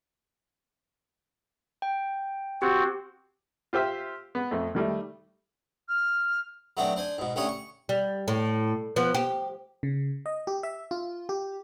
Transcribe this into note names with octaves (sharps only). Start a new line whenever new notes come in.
G5
C4 F#4 G4
F4 G4 C5 E5
B3
F2 A3
D#3 G3 A3
F6
F#3 A3 B3 C4 D4
D4 C5 G#5
G#2 B2
D3 G3 A3 C#4 G#4 C#5
C#6
G3
A2
F3 B3
G4
C#3
D#5
G4
E5
F4
G4